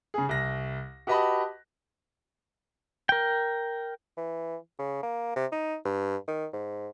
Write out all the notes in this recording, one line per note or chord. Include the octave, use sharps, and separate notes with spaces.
C#3 G#4
C2 A#6
F#4 G4 B4 D#5 A5 B5
A#4 G5
E3
C#3
A#3
C3
D#4
G2
D#3
G#2